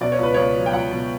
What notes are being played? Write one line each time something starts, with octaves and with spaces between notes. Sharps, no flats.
B2 D5
C#5
C#2 B4
C#2 C#5
F#3
G5
C#2 F#5
B2